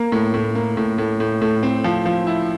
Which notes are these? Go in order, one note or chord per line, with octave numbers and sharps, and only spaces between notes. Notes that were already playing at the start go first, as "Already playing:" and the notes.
Already playing: A#3
A2
A2
A#3
A2
A2
A2
A2
C4
F3
F3
E4